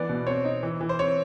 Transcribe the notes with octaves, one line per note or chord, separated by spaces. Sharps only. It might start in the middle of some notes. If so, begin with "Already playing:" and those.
Already playing: E3 B3 D5
B2
C4 C#5
D#4
E3
E3
C5
C4 C#5